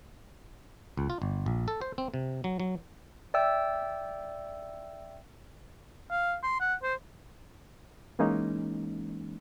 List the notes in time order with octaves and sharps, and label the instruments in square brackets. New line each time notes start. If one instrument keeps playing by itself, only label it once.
[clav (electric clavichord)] C#2
F4
G1
A#1
A4
C5
C4
C3
F#3
F#3
[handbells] D5 E5 G5 E6 G6
[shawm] F5
C6
F#5
C5
[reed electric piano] E3 G#3 A#3 C#4 D#4